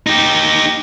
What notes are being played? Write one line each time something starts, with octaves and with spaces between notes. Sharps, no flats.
D#4 G4